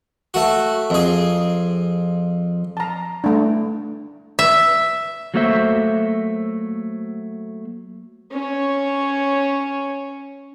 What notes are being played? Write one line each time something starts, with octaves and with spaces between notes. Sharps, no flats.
A3 F#4
F2 G#4
A5 A#5
A3 D4
E5
F#3 A3 A#3 F#4 C5 E5
C#4 C#5